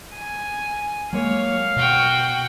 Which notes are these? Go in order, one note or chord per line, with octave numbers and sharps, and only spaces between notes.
G#5
F#3 G#3 A#3 C#5 F5
B2 F#4 G5